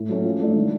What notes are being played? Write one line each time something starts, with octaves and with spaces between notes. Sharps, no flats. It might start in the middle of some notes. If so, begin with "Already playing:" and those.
Already playing: A2
F#3 A3 C#4
F3
A3 D4
D#3